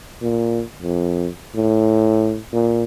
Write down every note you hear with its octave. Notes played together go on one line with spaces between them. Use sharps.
A#2
F2
A2
A#2